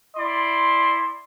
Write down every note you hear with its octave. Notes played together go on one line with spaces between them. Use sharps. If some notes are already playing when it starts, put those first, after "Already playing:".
E4 D5 C6